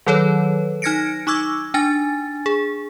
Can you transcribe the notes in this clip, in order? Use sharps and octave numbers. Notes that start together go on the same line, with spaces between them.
D#3 F#3 A4 B4 C#5
D#4 F6 G#6 A#6 C#7 D7
D#4 C#6 D6 E6 G#6
D4 G#5 A6
G#4